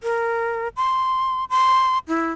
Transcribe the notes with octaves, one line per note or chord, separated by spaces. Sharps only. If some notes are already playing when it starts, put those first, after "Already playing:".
A#4
C6
C6
E4